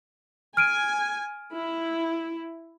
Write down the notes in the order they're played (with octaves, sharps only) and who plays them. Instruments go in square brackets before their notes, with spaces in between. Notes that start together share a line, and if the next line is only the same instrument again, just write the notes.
[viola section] G#5 [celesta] F6 D7 D#7
[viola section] E4